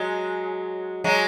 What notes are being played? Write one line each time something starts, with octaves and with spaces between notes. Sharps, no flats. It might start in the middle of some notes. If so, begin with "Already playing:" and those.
Already playing: F#3 G#3
F#3 G#3